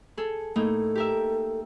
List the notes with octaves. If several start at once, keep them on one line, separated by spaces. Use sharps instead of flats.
G#4 A4
A2 A#3 D#4 A4
G4 A#4 E5